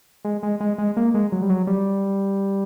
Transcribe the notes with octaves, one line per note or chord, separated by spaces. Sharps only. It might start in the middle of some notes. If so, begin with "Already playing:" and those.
G#3
G#3
G#3
G#3
A#3
G#3
F#3
G3
F#3
G3